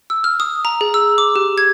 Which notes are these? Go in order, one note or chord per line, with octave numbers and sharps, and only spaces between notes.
E6
F6
D#6
A#5
G#4
E6
D6
G4
G#6